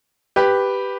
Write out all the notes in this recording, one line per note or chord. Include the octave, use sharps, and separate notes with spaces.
G4 B4